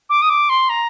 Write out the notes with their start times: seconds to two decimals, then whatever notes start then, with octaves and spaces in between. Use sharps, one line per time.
0.10 D6
0.22 D#6
0.29 D6
0.49 C6
0.69 A#5